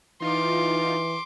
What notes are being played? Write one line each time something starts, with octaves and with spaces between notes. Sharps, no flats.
E3 D#4 F4 C6 D6